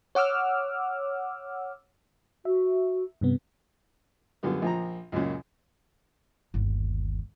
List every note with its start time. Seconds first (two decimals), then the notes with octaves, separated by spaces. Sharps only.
0.15 C#5 F#5 D6 E6 F6
2.45 F#4 E5
3.21 G2 C3 B3
4.43 F#2 D3 G3 B3 F4
4.62 A#1 F3 A#5
5.12 C#2 F#2 A#2 C#3
6.54 G1 D#2